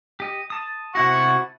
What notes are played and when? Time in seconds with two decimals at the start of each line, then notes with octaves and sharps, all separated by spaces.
0.20 G4 D#5
0.50 A5 D#6
0.95 C3 E4 F#4 F#5 C#6